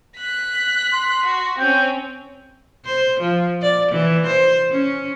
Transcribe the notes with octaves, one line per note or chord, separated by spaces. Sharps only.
F#6 B6
C6
F#4
C4 C#4 G5
C5
F3
D5
E3
C5
C#4